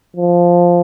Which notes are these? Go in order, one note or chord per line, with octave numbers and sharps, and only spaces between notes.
F3